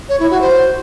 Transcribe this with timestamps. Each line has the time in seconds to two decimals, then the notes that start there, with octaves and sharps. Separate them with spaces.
0.09 C#5
0.20 E4
0.30 F#4
0.41 C5